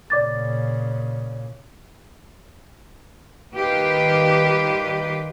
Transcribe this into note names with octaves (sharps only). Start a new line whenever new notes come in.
A#2 C#3 D5 D6 A6
D#3 G3 F4 G4 B4